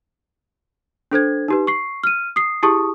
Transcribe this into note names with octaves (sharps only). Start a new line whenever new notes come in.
D4 A4 C5 G#6
D#4 G4 B4
C#6 C7
F6 D#7
D#6 C7
E4 G4 G#4 A5 C#6 D#6